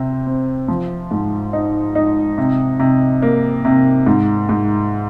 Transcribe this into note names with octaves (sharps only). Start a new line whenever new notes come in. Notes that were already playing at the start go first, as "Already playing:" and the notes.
Already playing: C3 C4
C4
F3
G#2
D#4
D#4
C3
C3
A#3
C3
G#2
G#2